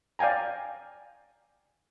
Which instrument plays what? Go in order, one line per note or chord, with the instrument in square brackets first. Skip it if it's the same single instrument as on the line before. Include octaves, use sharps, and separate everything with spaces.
[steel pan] D5 F5 G5 G#5 A#5